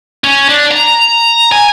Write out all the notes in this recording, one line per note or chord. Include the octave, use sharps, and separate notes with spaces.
C#4
D4
A#5
G#5